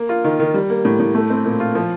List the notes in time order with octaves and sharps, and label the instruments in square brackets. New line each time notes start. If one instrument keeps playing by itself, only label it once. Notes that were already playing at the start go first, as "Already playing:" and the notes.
Already playing: [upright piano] A#3
F4
D#3
D#3
G3
A#3
A2
A2
A3
C4
A#2
F4
F3